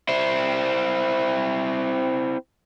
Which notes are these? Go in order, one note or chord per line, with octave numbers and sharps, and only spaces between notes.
C4 E4